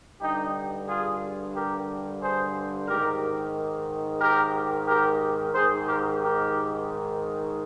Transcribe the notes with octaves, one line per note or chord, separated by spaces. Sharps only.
G2 D3 D#4 G4
F4 G#4
G4 A#4
G#4 C5
G#2 D#3 G4 A#4
G4 A#4
G4 A#4
G#2 D#3 G#4 C5
G4 A#4
G4 A#4